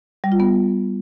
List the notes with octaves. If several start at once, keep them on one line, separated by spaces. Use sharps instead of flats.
G3
F4
B3